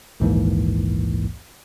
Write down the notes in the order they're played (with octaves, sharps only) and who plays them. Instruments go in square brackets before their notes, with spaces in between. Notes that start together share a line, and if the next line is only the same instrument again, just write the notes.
[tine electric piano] A#1 D#2 G#2 E3 A#3